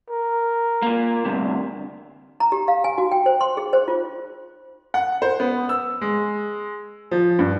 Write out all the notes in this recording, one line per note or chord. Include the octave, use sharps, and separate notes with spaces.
A#4
A#2 A#3
D2 G2 C3
A#5
G4
F5
G#5
F#4
G5
C5
C6
G#4
C5
F4
F#5
C5
B3
E6
G#3
F3
G2